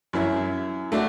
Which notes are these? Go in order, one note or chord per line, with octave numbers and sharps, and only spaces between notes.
F#2 E4
A3 D4 F#4